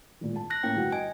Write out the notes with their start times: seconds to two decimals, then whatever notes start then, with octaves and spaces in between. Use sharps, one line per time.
0.21 G#1 A#2
0.36 A5
0.50 F#6 A#6
0.63 A2 A#3 C#4 G5
0.76 G1 F#4 F#5
0.92 D#5 G#5